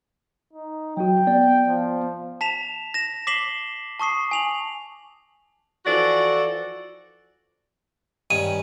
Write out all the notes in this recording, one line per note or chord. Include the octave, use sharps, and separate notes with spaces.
D#4
F#3 F#4 G5
B3 D5
F3
A5 B6 E7 F7
A#6 E7
D6 B6 C7 E7 F#7 G7
A5 C#6 D#6 C7
G#5 F7 F#7
E3 F3 F#4 A4 D5
G2 D#3 C#4 D#7